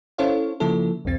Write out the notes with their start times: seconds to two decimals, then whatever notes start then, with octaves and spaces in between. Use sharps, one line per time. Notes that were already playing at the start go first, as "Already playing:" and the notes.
0.18 C#4 E4 A4 C5 C#5 F5
0.60 C#3 F3 A#3 E4 A4
1.05 B1 E2 C4 A6